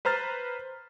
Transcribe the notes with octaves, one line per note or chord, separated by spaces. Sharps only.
B4 C5 A#5 F6 A6